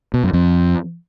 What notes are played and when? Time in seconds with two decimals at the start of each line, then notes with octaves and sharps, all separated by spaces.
0.14 B2
0.24 F#2
0.34 F2